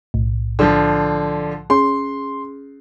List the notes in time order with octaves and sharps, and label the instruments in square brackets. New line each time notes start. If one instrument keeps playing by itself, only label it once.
[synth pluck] B1 A2
[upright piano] D3 F3
[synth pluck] C#4 G#4 [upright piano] C6